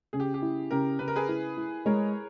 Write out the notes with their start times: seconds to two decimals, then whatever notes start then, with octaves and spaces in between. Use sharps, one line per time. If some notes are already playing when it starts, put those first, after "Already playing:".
0.13 C#3 G#4
0.20 G4
0.34 G4
0.42 E4
0.71 C#3 G4 A#4
0.99 C#3 B4
1.08 A#4
1.16 G#4 B4
1.28 E4
1.57 E4
1.86 G#3 A#4 C#5